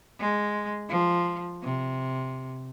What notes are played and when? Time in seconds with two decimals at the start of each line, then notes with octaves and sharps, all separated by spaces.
0.20 G#3
0.89 F3
1.63 C3